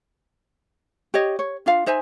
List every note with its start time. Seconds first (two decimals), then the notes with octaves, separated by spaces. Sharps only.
1.14 G4 C#5 D#5
1.39 C#5
1.66 D4 F4 F5
1.86 D#4 C5 E5 G#5